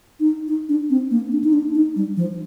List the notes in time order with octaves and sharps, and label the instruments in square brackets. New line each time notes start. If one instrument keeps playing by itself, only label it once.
[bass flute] D#4
D#4
D4
C4
A#3
D4
D#4
D4
D#4
G3
F3